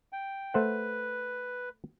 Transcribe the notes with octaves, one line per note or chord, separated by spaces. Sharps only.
G5
A3 B4 C5 F#5